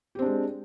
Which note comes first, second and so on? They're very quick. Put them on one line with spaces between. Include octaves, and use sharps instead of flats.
G4 C4 D4 G#3